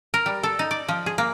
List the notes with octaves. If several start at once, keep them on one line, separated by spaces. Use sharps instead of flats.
A#4
G3
A4
D#4
D5
F3
G#4
A#3